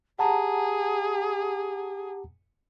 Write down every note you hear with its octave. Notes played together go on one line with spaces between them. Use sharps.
G4 G#4 F#5 A5 A#5